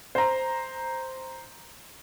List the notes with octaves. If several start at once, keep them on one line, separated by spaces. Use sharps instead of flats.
C5 A#5